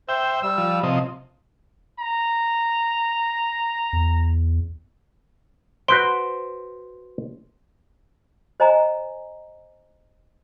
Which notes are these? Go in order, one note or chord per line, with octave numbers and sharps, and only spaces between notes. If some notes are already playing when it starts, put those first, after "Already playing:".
C5 E5 G5
G3 E6
F3
C3 F3 D#5
A#5
E2
F#4 B4 C5 C6 D7
C5 D#5 G#5 A#5